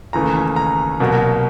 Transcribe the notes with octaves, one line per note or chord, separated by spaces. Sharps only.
D#2 C#3 E3 A3 A#5
A#5
C2 B2 F#3 A#3